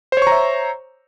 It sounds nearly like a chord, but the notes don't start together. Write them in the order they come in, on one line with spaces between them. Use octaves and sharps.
C5 C#5 C#6 A#5 E5